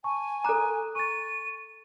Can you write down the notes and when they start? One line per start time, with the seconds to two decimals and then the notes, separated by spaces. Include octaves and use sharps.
0.04 G#5 A5 C#6
0.44 A4 A#5 D6 F#6
0.95 C#6 A6 D#7